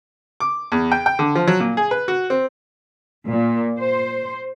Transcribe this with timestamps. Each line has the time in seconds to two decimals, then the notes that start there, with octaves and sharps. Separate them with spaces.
0.40 D6
0.72 E2
0.92 G5
1.06 G5
1.19 D3
1.35 F3
1.48 F#3
1.60 A#2
1.77 G#4
1.91 B4
2.08 F#4
2.30 C4
3.29 A#2
3.77 C5